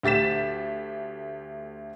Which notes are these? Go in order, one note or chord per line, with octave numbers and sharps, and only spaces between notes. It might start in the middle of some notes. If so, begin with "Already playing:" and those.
D2 G4 A6 B6 E7